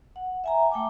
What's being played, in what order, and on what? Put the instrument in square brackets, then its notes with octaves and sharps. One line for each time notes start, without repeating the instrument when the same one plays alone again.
[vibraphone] F#5
E5 G#5 A#5
A3 G5 A5 D6